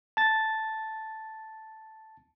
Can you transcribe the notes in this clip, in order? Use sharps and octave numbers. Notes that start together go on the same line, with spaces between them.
A5 A6